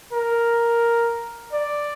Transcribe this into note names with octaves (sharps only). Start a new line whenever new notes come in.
A#4
D5